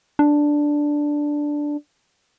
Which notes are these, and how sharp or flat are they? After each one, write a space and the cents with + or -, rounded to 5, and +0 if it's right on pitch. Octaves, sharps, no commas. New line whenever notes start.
D4 +0